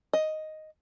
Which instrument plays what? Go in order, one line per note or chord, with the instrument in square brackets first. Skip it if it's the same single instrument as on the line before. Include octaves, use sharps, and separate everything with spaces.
[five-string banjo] D#5